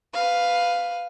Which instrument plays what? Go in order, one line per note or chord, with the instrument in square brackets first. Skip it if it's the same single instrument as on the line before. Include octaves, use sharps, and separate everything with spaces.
[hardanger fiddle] B4 F5